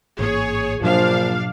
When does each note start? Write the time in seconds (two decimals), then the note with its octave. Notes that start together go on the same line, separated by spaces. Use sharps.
0.19 A1 G#2 A#3 G#4 C#5
0.81 A#1 G#2 B2 F3 F#3 D4 F5